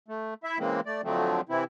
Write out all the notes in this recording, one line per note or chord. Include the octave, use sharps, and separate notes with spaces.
A3
E4 E5
C#3 E3 G#3 A#3 C4
A3 D5
F2 D3 F3 F#3 A3 C4
C3 E3 C4 E4